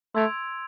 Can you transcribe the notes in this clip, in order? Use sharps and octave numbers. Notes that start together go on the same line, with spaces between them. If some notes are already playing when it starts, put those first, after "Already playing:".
A3 C6 E6 G#6 D7 F7